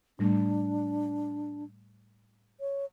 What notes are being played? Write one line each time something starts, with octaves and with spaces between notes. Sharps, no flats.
A2 G3 A3 D4
C#5